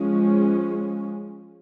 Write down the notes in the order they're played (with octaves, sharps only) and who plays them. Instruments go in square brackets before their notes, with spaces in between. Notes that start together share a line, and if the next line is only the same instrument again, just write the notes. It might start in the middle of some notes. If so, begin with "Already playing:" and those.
Already playing: [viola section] F3 G#3 C#4